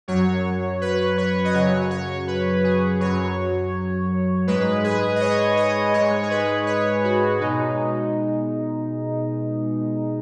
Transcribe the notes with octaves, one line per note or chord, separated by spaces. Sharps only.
F#2 F#3 C#5
B4
C#5
D#5
F#2 C#3 F#3 C#5
C#5
B4
G#4
F#2 F#3 C#5
G#2 G#3 B4
G#4
D#5
C#5
D#5
G#2 G#3 C#5
G#4
B4
C#5
F#4
B2 G#3 D#4